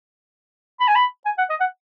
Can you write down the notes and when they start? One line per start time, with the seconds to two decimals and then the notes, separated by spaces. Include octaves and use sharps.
0.80 B5
0.88 G#5
0.95 B5
1.25 G#5
1.38 F#5
1.50 D#5
1.60 F#5